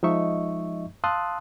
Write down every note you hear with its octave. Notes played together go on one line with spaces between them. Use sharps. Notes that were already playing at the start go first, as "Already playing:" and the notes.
F3 G#3 D#4 D#5 E5 C#6
F5 A5 C6 D#6 E6 F#6